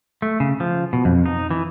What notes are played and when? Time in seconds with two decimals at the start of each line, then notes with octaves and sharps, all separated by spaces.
0.22 A3
0.40 C#3
0.60 F3
0.93 B2
1.05 F2
1.26 D#4
1.51 E3